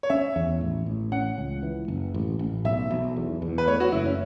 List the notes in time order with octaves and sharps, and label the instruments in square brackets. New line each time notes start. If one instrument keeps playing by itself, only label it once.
[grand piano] C#5
[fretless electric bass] C#4 [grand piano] E5
[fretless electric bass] E2
A1
A1
[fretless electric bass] C#4 [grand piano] F#5
[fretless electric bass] C#2
E3
F#1
A1
A1
[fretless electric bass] B1 [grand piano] E5
[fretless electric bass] B1
E2
E2
[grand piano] B4
[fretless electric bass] A3 [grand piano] C#5
[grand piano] F#4
[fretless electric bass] F#1 [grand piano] E4
[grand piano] C#4